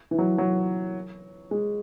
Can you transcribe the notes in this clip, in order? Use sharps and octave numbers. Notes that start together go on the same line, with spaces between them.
E3
F#3
F#3
G#3